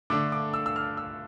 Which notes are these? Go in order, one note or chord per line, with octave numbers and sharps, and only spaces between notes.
D3 A3 D4 D6
D6
E6
E6
F6
E6